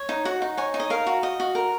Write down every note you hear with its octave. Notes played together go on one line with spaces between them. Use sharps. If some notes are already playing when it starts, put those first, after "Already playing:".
Already playing: C#5
D#4
F#4 F#5
D#4
C#5 G#5
D#4
D#5
A#4 F5
F#4
D#5
F#4
A#4